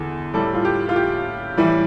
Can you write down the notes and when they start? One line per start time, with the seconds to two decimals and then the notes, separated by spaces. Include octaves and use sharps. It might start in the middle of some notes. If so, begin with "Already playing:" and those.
Already playing: E2 D3
0.34 A2 G3 A4
0.54 F4
0.65 G4
0.89 F4
0.96 G4
1.57 A2 E3 G3